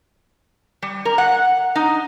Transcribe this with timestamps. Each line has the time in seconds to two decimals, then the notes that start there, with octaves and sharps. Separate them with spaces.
0.82 G3
1.05 A#4
1.18 F#5
1.75 D#4